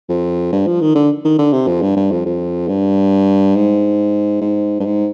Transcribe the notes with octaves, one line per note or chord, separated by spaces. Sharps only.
F2
G2
F3
D#3
D3
D#3
D3
C3
F2
G2
G2
F2
F2
G2
G#2
G#2
G2
G#2